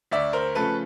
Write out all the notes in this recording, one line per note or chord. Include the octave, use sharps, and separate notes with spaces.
D2 D5 E5
A#4 C5
C#3 F3 A3 A4 B4